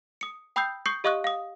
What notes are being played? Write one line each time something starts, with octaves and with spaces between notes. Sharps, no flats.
D#6 C#7
G5 B5 D#6 E6 G6 C7
C#6 D#6 G6 C7 C#7
G4 D#5 F5 C#6 D#6 F#6
F5 D#6